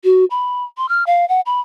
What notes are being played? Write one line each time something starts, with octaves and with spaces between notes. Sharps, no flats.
F#4
B5
C6
F6
F5
F#5
B5